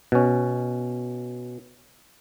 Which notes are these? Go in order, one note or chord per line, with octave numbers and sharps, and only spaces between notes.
B2 C#4